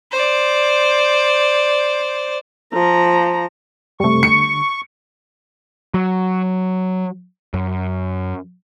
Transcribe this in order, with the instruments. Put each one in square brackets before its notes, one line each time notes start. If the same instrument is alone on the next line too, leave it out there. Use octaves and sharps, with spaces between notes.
[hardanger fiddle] C5 D5
[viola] F3 A#5
[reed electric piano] F#2 C3 [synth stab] G3 A3 [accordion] C#6
[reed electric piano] D3 [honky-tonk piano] C#7
[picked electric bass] F#3
F#2